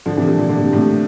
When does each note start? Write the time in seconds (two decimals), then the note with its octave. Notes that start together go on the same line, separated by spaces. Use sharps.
0.06 D3 F3
0.17 C3 E3
0.27 A#2 D3
0.38 A#2
0.49 D3
0.57 C3
0.65 A#2
0.73 A2 C3